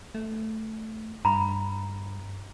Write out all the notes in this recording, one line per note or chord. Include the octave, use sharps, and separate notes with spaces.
A3
G2 A#5 B5